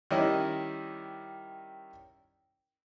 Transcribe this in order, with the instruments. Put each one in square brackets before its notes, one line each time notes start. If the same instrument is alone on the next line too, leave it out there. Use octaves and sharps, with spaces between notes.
[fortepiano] D#3 G3 C#4 E4 D#5